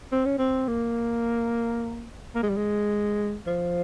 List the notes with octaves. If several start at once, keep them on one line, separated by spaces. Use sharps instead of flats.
C4
C#4
C4
A#3
A#3
G#3
G3
G#3
F3